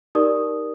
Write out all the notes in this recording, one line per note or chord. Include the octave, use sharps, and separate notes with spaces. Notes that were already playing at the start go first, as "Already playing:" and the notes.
D#4 G4 A#4 D5 D#6